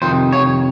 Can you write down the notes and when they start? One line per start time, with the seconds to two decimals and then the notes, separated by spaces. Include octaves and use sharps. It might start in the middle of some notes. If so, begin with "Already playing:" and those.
0.02 F2 C3 D#3 C5
0.33 C#5